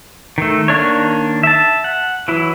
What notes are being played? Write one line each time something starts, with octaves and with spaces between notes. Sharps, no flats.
D#3 A3
D#3 A#3 D4 C#5
E5 A5
F#5
E3 F#3 E4